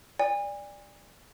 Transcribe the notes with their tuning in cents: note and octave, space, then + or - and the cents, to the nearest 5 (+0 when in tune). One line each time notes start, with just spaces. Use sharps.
D5 +0 G#5 -35